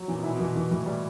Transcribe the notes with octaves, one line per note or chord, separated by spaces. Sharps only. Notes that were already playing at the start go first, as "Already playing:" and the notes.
Already playing: F#3
A#2 E3
B2
A#2 E4
B2
A#2 E3
E3
A2 E3
A2 G3